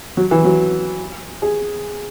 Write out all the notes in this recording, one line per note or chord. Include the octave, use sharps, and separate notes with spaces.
F#3
E3
F#3
G#4